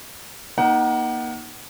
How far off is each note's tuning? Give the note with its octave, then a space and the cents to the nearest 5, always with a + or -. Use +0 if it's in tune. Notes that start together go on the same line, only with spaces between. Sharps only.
A#3 +35 D#4 +0 F#5 +25